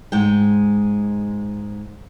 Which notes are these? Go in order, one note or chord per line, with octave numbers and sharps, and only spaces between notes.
G#2 G#3 G5